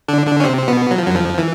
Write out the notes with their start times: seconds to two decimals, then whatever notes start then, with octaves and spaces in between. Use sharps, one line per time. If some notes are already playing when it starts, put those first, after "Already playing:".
0.08 D3 D4
0.27 D3 D4
0.40 C#4
0.44 C3 C4
0.68 B2 B3
0.91 F#3
0.98 F3
1.06 F#2 F#3
1.15 F2 F3
1.38 E3